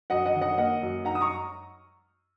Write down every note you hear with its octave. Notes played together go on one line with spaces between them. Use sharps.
F#2 D#5 F#5
D#5 F#5
D#3
D#5 F#5
A#3 D#5 F#5
F#2
D#4 F#5 A#5
D#6
A#5 C#6